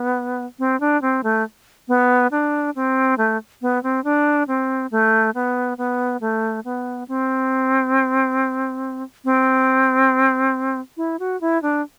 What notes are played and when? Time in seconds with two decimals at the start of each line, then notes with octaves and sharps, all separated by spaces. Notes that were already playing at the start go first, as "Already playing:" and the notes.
Already playing: B3
0.59 C4
0.80 D4
1.02 C4
1.24 A3
1.88 B3
2.31 D4
2.75 C4
3.18 A3
3.62 B3
3.83 C4
4.04 D4
4.48 C4
4.91 A3
5.34 B3
5.78 B3
6.21 A3
6.65 B3
7.08 C4
9.24 C4
10.97 E4
11.19 F#4
11.41 E4
11.62 D4